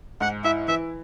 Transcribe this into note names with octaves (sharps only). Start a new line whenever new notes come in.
G#2 F#5
E4 E5
E3 E5